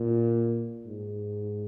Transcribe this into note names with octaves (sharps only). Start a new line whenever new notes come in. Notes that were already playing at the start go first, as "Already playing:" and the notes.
Already playing: A#2
G#2